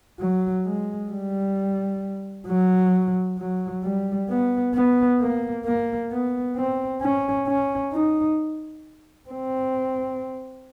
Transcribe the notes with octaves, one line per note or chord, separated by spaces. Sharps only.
F#3
G#3
G3
F#3
F#3
G3
B3
B3
A#3
A#3
B3
C4
C#4
C#4
D#4
C4